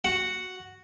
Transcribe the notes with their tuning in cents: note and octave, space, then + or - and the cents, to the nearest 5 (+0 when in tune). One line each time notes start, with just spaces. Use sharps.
F#4 +0 F#5 +0